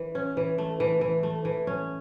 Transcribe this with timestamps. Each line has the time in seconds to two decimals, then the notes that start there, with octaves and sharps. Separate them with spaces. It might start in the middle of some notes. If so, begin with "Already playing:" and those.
Already playing: E3
0.15 C#4
0.37 E3
0.58 A3
0.80 E3
1.01 E3
1.23 A3
1.45 E3
1.67 C#4